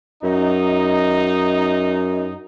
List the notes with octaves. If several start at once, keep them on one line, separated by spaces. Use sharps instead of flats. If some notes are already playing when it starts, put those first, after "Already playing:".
F#2 D#4